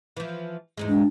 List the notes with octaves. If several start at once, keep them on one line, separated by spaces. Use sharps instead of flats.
E3 F3
E2 G#2 G#3
D4